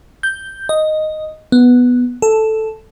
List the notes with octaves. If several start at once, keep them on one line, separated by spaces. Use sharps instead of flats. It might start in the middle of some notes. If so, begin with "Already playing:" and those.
G6
D#5
B3
A4